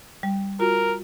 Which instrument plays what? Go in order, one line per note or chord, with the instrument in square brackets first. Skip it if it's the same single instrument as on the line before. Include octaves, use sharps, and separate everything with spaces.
[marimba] G3
[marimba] F4 F#4 [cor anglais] A#4